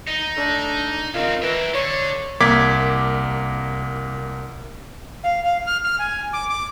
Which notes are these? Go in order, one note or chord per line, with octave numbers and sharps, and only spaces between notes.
D#4
A3 D4
C#2 D#3 C4 D#4 F4
E3 A#4 E5
D3 C#5
C2 A#3 D6 G#6 B6
F5
F5
F6
F6
G#5
D6
D6